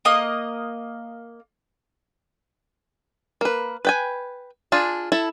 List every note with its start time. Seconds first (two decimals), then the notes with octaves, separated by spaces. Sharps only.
0.05 A#3 D#5 D#6
3.41 A#3 B4
3.85 B4 G5 G#5
4.72 D4 F4 G#4
5.12 E4 A4